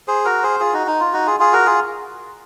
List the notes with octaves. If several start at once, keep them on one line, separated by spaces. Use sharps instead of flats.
G#4 C5
F#4 A#4
G#4 C5
F4 G#4
D#4 F#4
D#4
F4
D#4 F#4
F4 G#4
F4 G#4
F#4 A#4
F4 G#4